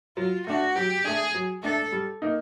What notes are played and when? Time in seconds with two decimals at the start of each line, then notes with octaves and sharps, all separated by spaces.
0.17 F#3 F4
0.47 A3 D4 F#4
0.76 F#3 G4
1.04 A3 D4 G#4
1.34 F#3
1.63 A3 D4 A4
1.92 G3
2.22 A#3 D#4